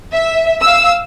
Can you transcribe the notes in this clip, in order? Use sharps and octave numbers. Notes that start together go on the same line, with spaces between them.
E5
F5 E6